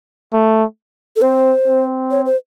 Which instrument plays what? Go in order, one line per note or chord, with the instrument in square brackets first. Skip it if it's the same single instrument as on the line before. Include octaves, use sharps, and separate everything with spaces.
[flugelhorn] A3
[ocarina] A4
[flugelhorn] C4 [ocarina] C5
[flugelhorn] C4
[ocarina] C#5
C5